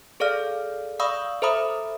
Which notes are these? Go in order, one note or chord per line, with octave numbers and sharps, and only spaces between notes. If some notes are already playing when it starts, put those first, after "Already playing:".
G#4 A4 D5 F5 F6
D5 F5 B5 C#6 D#6 E6
A4 C5 E5 A#5 B5 D#6